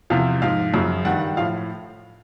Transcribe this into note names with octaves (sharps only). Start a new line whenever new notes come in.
E2 C3 F3 F5
G#2 F3 F5
F#2 C#3 F3
G2 D#3 G3 F#5
A2 F3 F5